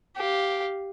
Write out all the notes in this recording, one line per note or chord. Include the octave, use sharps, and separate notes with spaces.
G4 F5